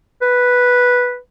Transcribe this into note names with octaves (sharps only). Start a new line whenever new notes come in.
B4